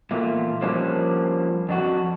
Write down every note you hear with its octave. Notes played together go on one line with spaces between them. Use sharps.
E2 A#2 A3 A#3 F4
F3 G3 A#3 C#4 D4
F2 D4 F#4